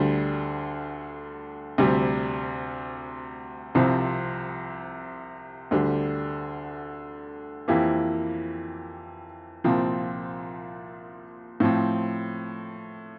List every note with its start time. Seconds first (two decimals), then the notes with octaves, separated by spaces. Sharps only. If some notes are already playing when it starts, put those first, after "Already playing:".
Already playing: D2 D3 G3
1.78 D2 C3 G3
3.75 C2 C3 F3 C4
5.71 D2 D3 G3
7.68 F2 E3 A#3 E4 G4
9.64 C2 A#2 F3 C4
11.60 A2 F3 C4